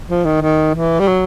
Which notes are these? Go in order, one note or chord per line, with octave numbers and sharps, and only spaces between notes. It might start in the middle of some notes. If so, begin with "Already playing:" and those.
F3
D#3
D#3
E3
G3
F#3